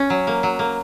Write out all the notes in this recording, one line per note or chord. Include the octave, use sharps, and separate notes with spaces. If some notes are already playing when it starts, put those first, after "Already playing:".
Already playing: C#4
F#3
A#3
F#3
A#3